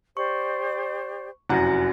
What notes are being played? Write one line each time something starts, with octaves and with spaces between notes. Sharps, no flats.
G4 C5 D5 C#6
F1 F#2 E4 F#4 F#5 A#6